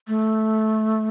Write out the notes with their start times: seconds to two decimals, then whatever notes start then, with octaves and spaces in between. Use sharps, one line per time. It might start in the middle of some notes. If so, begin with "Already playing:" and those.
0.08 A3